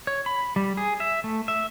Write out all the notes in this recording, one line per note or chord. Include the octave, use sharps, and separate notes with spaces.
C#5
B5
G3
G#4
E5
A3
E5